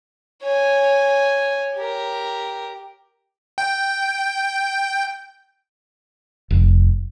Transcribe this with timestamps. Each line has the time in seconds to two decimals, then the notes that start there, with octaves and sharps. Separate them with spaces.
0.43 C#5 G#5
1.75 G4 A#4
3.58 G5
6.51 F1